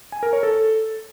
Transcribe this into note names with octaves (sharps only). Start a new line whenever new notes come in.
G#5
A#4
C#5
A4